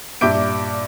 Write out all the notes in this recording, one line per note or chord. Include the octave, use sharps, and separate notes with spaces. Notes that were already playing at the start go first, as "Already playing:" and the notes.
G2 A#2 E5 D6 G6 D7